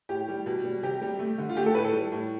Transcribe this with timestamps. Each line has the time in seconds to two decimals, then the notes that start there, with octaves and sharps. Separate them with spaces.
0.09 A2 G4
0.28 G3
0.46 B2
0.64 G3
0.83 C3 G4
1.02 G3
1.19 A3
1.38 D3
1.49 F4
1.57 A3 G4
1.66 A4
1.74 A2 B4
1.84 A4
1.93 G3
2.12 A2